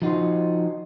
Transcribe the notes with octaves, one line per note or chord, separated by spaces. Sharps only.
F3 D#4 F#4 C5